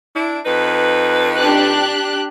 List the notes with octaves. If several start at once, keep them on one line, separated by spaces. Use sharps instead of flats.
D4 E4
F2 D#4 B4
D4 G4 F#6